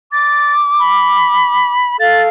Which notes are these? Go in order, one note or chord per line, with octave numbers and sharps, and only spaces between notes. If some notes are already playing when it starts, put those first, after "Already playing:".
D6 A6
B5
A4 F5 A6